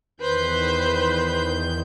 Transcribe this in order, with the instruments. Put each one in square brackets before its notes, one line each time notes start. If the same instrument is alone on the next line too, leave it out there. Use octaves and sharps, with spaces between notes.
[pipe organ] E2 D#3 G6 [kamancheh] B4 C5